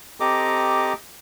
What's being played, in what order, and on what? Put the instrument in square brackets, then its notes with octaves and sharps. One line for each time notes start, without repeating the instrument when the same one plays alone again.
[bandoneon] C4 A4 A#5 [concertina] G4 D#5 D6